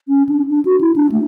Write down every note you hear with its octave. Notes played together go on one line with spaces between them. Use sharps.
C#4
D4
D4
F#4
E4
D4
A3